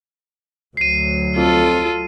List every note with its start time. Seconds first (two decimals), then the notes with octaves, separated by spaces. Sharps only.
0.77 D2 F#3 C7 D#7
1.36 F2 F4 A4